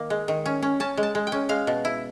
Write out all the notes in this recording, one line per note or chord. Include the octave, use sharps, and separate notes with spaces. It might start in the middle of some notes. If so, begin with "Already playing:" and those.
Already playing: D#3 A#3
G#3
D#3
C#4
C#4
C#4 A5
G#3
A5
G#3
G5
C#4
G#3 F5
B2
E4